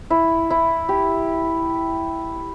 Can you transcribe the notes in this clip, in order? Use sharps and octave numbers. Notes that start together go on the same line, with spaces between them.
E4
E4
G4